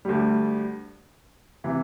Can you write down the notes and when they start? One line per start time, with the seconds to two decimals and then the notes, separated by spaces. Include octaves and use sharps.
0.05 D2 D3 G3
1.64 C3 E3